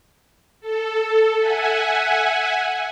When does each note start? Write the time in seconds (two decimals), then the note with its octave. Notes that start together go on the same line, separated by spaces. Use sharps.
0.61 A4
1.40 E5 F#5 G#5